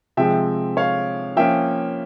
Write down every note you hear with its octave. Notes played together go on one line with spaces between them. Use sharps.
C3 F3 G#3 C4 E5 G5
C#5 F5
F3 A#3 C#4 E5 G5